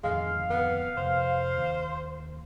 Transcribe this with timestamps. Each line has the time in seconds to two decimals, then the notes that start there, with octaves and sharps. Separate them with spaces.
0.04 D1 F2 D#3 G#3 F5
0.50 B3
0.97 F1 C5
1.57 D#2